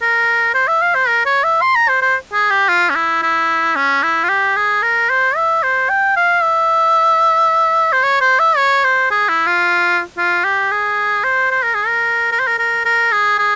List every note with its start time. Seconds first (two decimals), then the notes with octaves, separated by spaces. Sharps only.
0.02 A#4
0.54 C5
0.68 E5
0.82 F5
0.95 C5
1.08 A#4
1.26 C#5
1.44 E5
1.61 C6
1.75 A#5
1.89 C5
2.02 C5
2.33 G#4
2.50 G4
2.69 F4
2.90 C#4
2.95 E4
3.22 E4
3.76 C#4
4.03 E4
4.24 F4
4.29 G4
4.56 G#4
4.82 A#4
5.10 C5
5.36 E5
5.63 C5
5.90 G5
6.16 F5
6.43 E5
7.92 C5
8.03 C#5
8.21 C5
8.39 E5
8.57 C#5
8.84 C5
9.11 G#4
9.29 E4
9.46 F4
10.18 F4
10.44 G4
10.71 G#4
11.24 C5
11.51 C5
11.63 A#4
11.74 G#4
11.87 A#4
12.32 A#4
12.40 C5
12.47 A#4
12.59 A#4
12.85 A#4
13.12 G#4
13.39 G#4